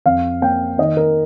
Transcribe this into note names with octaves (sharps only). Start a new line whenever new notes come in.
F2 F5
A#3 G5
D#3 D#5
A#4